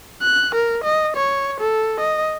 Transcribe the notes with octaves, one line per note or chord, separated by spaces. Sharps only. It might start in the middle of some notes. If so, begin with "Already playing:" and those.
F#6
A#4
D#5
C#5
A4
D#5